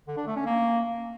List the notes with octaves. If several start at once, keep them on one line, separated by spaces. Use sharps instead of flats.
D3
D4
A3
C#4
A#3